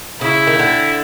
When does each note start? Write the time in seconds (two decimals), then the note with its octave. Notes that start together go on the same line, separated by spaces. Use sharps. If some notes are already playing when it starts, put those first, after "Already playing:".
0.21 C#3 E4
0.47 D#3
0.59 D3